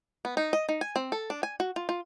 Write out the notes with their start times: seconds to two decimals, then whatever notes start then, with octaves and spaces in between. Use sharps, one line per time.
0.25 B3
0.37 D#4
0.53 D#5
0.69 D#4
0.81 G#5
0.96 C4
1.12 A4
1.30 D4
1.43 G#5
1.60 F#4
1.76 F4
1.89 F4